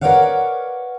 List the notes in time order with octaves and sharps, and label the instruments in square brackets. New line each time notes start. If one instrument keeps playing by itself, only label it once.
[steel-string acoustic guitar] A#4 B4 C#5 D5 F5 F#5